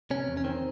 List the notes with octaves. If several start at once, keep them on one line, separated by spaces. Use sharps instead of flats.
C3 C#4
E2
C#4
D#3 C4